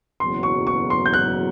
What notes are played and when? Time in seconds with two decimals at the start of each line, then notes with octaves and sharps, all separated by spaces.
0.20 F#1 E2 B2 F#3 C6
0.43 C#6
0.67 C#6
0.90 C6
1.06 G6
1.13 F#6